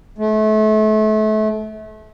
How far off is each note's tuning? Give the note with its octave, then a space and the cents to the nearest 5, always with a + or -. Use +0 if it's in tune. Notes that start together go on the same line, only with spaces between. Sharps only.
A3 -30